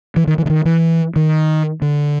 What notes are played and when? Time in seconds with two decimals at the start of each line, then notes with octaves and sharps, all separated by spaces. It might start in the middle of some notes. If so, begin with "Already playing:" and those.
0.16 E3
0.27 D#3
0.38 E3
0.46 D3
0.50 D#3
0.65 E3
1.16 D#3
1.82 D3